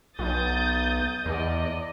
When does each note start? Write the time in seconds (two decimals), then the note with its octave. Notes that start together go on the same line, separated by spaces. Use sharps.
0.19 B1 D#6 G6 A6
1.26 E2 D5 D#5